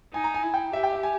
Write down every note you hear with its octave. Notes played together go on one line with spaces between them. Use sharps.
D#4 G#5
A#5
G#5
E4
G5
G4 E5
G5
E5
G#5